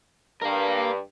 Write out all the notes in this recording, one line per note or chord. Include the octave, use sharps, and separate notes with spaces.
G2 A#4 F5